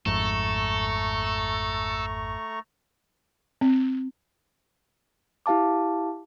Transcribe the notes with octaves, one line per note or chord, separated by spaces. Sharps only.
G#1 F2 G#2 A3 A4 A#5 C#6
C4
E4 G4 F5 A5 D6